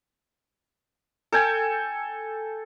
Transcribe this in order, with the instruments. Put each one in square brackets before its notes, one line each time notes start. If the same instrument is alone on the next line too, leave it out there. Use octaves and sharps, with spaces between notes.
[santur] A4 G5 G#5